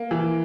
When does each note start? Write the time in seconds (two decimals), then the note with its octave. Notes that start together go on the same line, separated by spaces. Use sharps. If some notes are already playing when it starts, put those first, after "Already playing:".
Already playing: A#3
0.11 E3